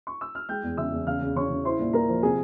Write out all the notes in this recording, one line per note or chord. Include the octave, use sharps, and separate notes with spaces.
C#6
E6
F6
G#3 G5 G6
E2
C#3 E5 E6
E2
C#3 F5 F6
C#3
C#3 C#5 C#6
C#3
E4 C5 C6
A#2
A#2 A#4 A#5
F3
C3 G#4 G#5